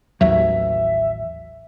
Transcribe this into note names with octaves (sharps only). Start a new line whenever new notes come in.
A1 D#2 F#3 E5